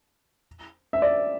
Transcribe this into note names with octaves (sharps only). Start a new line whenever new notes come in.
E5
D5